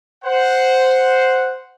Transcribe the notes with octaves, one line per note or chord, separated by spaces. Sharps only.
C5 F#5